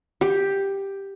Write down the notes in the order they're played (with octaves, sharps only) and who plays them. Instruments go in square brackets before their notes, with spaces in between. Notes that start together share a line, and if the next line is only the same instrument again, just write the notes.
[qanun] G4